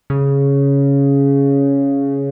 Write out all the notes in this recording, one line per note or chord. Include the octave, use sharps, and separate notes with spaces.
C#3